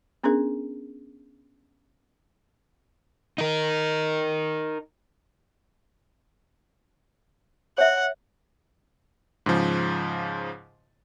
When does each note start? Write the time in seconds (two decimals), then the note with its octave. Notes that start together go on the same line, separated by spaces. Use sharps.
0.24 B3 C#4 D4 G#4 A#4
3.38 D#4 A#4
7.78 C#5 E5 F#5
9.46 G#2 C#3 F3